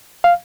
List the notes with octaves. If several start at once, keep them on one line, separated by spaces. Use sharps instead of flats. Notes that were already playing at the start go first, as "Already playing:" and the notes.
F5